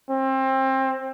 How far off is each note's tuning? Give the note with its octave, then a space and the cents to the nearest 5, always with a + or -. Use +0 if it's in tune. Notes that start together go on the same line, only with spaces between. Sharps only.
C4 +25